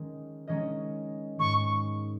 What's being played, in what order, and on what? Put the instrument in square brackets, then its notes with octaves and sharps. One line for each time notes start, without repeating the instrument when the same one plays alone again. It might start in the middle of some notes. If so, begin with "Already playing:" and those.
Already playing: [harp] D#3 G#3 C#4 A#4
D#3 G#3 C#4 A#4 D#5
[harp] G#2 D#3 G#3 [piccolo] C#6